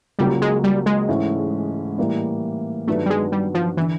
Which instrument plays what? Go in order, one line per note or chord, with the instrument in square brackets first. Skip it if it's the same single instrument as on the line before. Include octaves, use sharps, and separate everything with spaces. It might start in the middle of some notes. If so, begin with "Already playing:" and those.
[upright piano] C#2 C#3 F#3 A#3 C#4 [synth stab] G3
[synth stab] G#3
G3
G#3
[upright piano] G#2 E3 A3 C#4 E4
A2 E3 G3 A#3
[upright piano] G2 D#3 F#3 B3 D4 [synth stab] A3
[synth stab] G3
G#3
G3
F3
[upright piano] D3 [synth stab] E3